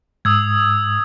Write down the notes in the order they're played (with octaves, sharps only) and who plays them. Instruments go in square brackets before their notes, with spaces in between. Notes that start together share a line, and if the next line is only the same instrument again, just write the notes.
[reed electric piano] G#2 [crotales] D#6 E6 G#6